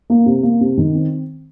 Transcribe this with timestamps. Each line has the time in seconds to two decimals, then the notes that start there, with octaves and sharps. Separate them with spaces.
0.10 A#3
0.26 C3
0.43 A#3
0.61 C3
0.78 D#3
0.95 C4